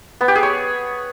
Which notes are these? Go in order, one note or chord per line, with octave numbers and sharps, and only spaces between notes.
B3
G4
G#4
C#5